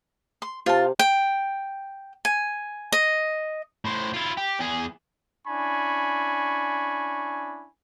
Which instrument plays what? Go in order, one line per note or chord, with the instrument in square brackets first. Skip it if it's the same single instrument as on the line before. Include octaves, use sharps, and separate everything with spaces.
[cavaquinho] C6
[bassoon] C3 [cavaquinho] F4 A5
[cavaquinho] G5
G#5
D#5
[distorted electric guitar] A2 C5
E4 F4
G4
E2 G#4
[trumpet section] C#4 D4 E4 G#5 B5 C#6